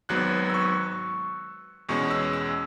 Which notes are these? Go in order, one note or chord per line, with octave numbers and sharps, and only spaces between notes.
G#1 G#2 F#3 B3 F#6
E6
C#6
E2 B2 G#3 C#4 C#6
E6
E6